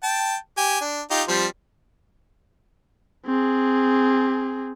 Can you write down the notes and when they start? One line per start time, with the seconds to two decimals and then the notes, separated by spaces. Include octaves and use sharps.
0.03 G5 A5
0.58 G4 G#5
0.81 D4
1.11 D#4 F4 G4
1.28 F3 G3 C4
3.26 C4 G#4